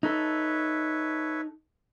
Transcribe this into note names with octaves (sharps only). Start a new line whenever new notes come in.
D#4 A4 B4 C#5 E5